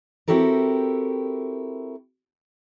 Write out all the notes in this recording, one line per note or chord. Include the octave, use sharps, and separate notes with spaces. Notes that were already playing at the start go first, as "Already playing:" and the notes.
C4 E4 F#4 G4 A4 A#4